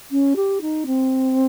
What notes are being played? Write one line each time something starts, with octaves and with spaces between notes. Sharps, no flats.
C#4
G4
D#4
C4